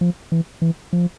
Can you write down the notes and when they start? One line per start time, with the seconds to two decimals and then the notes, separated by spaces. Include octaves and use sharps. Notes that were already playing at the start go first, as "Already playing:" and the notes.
0.01 F3
0.32 E3
0.62 E3
0.93 F3